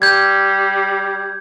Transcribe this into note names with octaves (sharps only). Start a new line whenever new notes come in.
G3 G6 G#6